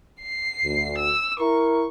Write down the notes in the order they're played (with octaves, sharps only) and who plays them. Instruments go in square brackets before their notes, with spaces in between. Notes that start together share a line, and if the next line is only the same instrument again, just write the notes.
[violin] C7
[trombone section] D2
[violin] E6
[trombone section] E4 A#4 [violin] C#6